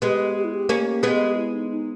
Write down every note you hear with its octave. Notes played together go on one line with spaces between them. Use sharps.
G#3 B3 G4
G4
E4
G4
A#3 C#4
G#3 B3
E4
D#4
D#4